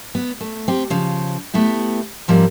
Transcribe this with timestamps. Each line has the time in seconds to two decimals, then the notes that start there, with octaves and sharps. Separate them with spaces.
0.15 B3
0.41 A3
0.68 C4 G4
0.90 C#3 F3
1.54 A3 B3 E4 G4
2.28 G#2 F3 G3 A#3 C4